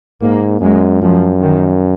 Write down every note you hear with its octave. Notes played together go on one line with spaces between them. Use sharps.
G#2 A#3
F#2 G#3
F#2 F3
D#3